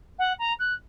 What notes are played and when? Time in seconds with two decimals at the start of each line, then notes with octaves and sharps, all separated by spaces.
0.18 F#5
0.38 A#5
0.59 F#6